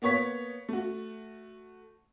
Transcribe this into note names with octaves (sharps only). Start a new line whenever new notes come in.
A#3 B3 C#5 C#6 B6
A3 F#4